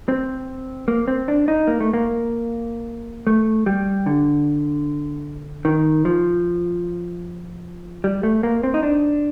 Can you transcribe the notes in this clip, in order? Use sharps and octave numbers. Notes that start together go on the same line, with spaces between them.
C4
A#3
C4
D4
D#4
A#3
A3
A#3
A3
G3
D3
D#3
F3
G3
A3
A#3
C4
D#4
D4